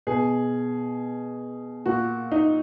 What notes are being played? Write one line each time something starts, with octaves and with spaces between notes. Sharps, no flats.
B2 G#4
A#2 F#4
D#4